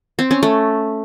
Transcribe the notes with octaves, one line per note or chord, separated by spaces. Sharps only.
C4
C#4
A3